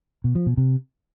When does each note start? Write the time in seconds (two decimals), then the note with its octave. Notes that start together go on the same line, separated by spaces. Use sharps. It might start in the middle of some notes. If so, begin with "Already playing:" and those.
0.24 B2
0.35 F3
0.46 B2
0.57 C3